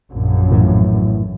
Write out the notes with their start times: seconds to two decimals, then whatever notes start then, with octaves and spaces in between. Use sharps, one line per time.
0.11 A#1 F#2
0.52 A2 E3